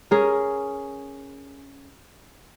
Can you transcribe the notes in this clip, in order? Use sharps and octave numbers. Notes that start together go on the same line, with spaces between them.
C#4 G#4 A#4